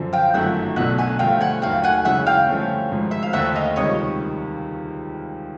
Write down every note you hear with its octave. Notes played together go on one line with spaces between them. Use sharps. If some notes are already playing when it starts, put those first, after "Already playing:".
Already playing: F#2 D3 F3
F5 G5
G1 F#2 D#3 F#3 A3 E5 F#5
B1 B2 F#3 A3 D4 E5 F#5
F#5 G#5
G2 D3 F3 A3 F5 G5
F#5 G#5
D#2 D#3 F#3 A3 F5 G5
F#5 G#5
F#2 C#3 E3 G#3 C#4 E5 F#5
F5 G5
G2 D3 F3 A3 C#4
G#1 G#2 F3
E5
F5
D#2 D3 F3 A3 E5 F#5
D#5 F5
C#2 C3 D#3 G3 C#5 D#5